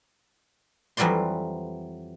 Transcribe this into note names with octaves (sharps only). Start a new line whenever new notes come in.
F2 E3 F#3 G3 D5 C6